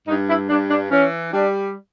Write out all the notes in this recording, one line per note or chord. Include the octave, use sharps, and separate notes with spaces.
G2 D#4
E4
G2 D4
D4
E3 C#4
G3 D4